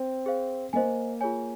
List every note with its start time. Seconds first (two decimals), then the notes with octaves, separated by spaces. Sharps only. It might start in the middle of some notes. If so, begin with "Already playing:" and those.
Already playing: C4
0.26 G#4 C5 F5
0.73 A#3 C5 D#5 G#5
1.21 F4 G#4 C#5 G#5